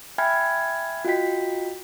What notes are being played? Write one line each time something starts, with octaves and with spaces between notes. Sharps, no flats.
E5 G5 G#5 B5 F6 G#6
F4 F#4 D#5 G5 B6